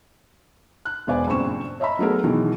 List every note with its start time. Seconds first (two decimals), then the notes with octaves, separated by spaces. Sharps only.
0.85 F#6
1.07 E1 B3 C5 D5 G#5
1.27 F#1 G2 A#2 C4 C#6 E7
1.80 C#5 D#5 E5 A#5 B5
1.99 F#3 G#3 A3 B3 G#4 A#4
2.24 B2 D#3 E3 F#3 G#3